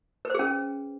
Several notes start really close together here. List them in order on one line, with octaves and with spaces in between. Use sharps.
B4 C5 G#4 C#4